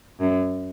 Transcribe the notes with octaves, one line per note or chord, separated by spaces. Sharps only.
F#2